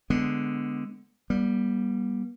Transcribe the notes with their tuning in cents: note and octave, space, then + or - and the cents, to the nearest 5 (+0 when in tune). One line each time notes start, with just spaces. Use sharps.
D3 +0 G#3 +0 B3 +10
G3 +0 B3 -45